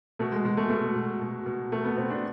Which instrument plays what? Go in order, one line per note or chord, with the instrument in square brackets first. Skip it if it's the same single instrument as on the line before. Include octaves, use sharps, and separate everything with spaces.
[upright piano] B2 A3
G#3
B2 G#3
A3
B2 A3
B2
B2
B2
B2 A3
B3
B2 C4
D4